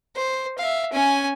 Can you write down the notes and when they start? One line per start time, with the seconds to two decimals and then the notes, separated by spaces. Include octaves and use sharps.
0.16 C5
0.58 E5 F5
0.92 C#4 G#5